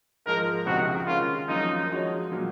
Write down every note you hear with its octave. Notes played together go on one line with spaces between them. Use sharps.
G#2 F3 G#3 A#4
C#2 C3 F3 C4 D#4 F#4
D#3 G#3 C#4 F4
F#2 F3 A#3 C#4 D#4
F3 G#3 D#4 F#4 C#5
A#2 F#3 A#3